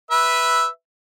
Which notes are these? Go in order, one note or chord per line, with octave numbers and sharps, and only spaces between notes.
B4 E5